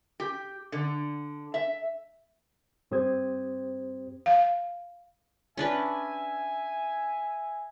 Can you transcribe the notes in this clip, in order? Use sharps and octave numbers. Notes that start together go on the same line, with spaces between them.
G4
D3
E5
G2 C4 G4 C5 D#6 G#6
F5
C#4 D4 B4 E5 G#5